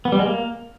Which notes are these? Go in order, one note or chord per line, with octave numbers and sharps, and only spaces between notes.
B3
G3
G#3
A#3